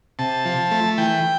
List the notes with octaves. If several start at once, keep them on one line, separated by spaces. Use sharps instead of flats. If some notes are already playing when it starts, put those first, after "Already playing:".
C3 A5
F3
A3
E3 G5